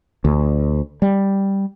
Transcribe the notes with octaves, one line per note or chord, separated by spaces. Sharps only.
D2
G3